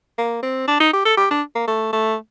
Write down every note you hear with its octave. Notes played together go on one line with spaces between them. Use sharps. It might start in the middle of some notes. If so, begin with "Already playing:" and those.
A#3
C4
D4
D#4
G4
A4
G4
D4
A#3
A3
A3